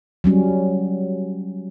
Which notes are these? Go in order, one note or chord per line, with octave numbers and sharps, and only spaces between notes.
F#3 G3 C#4